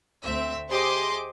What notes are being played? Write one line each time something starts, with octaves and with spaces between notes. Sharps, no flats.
D2 C4 E5
G4 G#4 C5 D#5 C6 D6